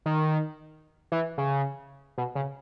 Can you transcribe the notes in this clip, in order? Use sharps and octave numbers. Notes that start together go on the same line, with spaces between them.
D#3
E3
C#3
B2
C#3